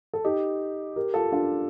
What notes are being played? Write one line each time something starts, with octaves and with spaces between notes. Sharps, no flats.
A4
D#4 G4
G4 A#4
F4 A4
D4 F4